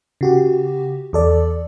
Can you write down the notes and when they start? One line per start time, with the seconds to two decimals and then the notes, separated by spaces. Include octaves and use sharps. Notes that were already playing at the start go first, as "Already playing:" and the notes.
0.21 C#3 F#4 G4
1.13 E2 A4 D5